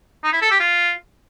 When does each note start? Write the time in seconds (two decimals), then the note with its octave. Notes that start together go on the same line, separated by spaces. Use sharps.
0.24 D#4
0.33 E4
0.42 A4
0.51 G4
0.60 F4